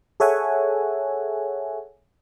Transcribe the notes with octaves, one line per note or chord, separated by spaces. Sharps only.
G#4 A4 C#5 E5 F#5 G#5